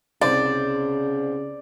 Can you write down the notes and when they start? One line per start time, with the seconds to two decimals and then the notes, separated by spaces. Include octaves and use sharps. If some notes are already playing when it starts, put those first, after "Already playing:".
0.21 C2 C#3 C5 D5